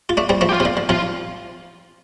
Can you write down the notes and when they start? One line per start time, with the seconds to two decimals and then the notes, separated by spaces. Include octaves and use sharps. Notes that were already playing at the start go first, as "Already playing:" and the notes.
0.09 F4
0.17 A3 D4
0.29 G3 C4
0.41 F3 A3
0.49 G4
0.53 F4
0.60 C3
0.65 D3
0.77 D3
0.89 C3 F3 F4